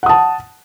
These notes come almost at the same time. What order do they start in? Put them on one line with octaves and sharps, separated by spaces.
F#5 D#6 A5